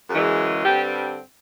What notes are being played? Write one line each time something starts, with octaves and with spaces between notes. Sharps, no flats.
F#2 C#3 E3 G#3
G2 D3 G3 C4 G4